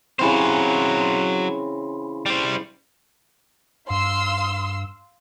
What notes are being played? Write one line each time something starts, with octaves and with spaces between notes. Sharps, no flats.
C#3 E3 F#3 C4 C5
G3 C5
G2 F5 C6 E6